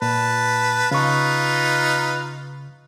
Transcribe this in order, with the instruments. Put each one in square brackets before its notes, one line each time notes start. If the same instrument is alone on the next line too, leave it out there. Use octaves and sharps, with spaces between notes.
[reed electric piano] A#2 [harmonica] B4 A5
[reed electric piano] C#3 C#6 [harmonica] D#4 F4 B4